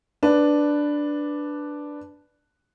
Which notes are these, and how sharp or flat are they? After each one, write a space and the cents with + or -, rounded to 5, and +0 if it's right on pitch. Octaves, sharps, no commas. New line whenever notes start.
D4 +0 B4 +0